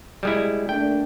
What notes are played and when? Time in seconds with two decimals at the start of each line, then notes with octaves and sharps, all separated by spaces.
0.23 G3 G#3 E4
0.69 A3 A#3 D4 G5